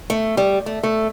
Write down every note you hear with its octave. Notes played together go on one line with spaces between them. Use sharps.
A3
G3
A3
A3